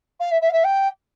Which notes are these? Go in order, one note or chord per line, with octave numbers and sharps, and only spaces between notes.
F5
E5
E5
F5
E5
G5